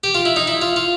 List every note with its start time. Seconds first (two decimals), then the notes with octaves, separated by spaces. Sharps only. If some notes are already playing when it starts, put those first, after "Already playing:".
0.04 G4
0.15 F4
0.25 E4
0.36 D#4
0.47 E4
0.62 F4
0.76 F4